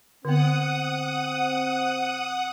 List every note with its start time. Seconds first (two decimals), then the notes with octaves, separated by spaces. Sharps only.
0.25 D3 B3 C4 F#5 D#6